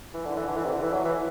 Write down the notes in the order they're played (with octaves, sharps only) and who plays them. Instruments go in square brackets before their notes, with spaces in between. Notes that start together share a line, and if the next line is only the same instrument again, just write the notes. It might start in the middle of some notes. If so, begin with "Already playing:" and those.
[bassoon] E3
D3
E3
D3
E3
C3
D3
E3
F#3
E3